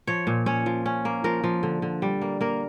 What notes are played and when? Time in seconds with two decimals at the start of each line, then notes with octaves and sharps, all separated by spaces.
0.07 F3 C#5
0.27 A#2
0.46 C#4 C#5
0.66 F3
0.86 C#4
1.05 A#3
1.24 F3 A#4
1.44 F3
1.63 D3
1.82 D3
2.02 G3
2.22 A#3
2.41 A#3 A#4